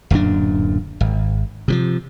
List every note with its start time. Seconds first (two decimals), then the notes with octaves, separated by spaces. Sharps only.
0.11 D1 F#2 A#2 D4
1.01 G#1
1.68 C3 D#3 F3